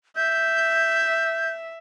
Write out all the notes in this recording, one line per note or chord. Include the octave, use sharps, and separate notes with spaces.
E5 G6